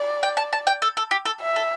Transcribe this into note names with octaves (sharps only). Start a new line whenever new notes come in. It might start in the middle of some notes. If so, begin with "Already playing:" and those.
Already playing: D5
G5
A5
A5
G5
A4
A4
G4
A4
E5
A4